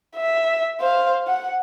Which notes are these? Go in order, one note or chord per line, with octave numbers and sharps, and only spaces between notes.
E5
C5 F5
F#5